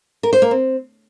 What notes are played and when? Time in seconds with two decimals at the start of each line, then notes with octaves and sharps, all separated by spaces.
0.23 A#4
0.33 C5
0.42 A#3
0.51 C4